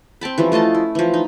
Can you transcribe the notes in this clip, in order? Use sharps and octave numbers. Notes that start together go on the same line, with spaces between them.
C4 G5 A5 B5
E3 F3 G3 C#4
A3 F4 D#5 A5
E4
E3 F3
D#4